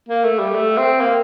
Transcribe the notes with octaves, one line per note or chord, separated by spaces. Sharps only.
A#3
A3
G3
A3
C4
A#3